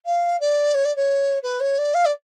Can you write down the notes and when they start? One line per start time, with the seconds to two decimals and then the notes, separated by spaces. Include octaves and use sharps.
0.06 F5
0.40 D5
0.74 C#5
0.85 D5
0.96 C#5
1.43 B4
1.60 C#5
1.78 D5
1.94 F5
2.05 D5